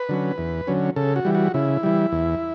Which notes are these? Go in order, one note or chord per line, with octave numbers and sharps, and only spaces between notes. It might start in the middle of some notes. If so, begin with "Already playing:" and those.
Already playing: B4
D3 F#3 C#4
E2
D3 F#3 C#4
C#3 A4
F#4
E3 G3
F#4
C#3 E4
E3 G3
E2